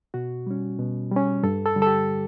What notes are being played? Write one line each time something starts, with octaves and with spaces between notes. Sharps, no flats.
B2 F#4
G3 C#4
B2
G3 C#4
G2 A4
A4
D3 G3
A4
G4